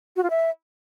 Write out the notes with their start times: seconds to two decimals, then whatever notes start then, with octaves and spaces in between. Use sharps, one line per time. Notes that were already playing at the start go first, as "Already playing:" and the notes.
0.16 F#4
0.23 F4
0.30 E5